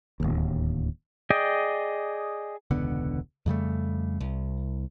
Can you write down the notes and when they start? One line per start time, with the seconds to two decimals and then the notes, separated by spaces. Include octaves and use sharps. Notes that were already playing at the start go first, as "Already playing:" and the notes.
0.20 D1 G#1 D#2
1.30 G#4 D5 D#5 G5
2.71 E1 C#2 D3 B3
3.46 F2 C#3 G3 A3
4.20 C2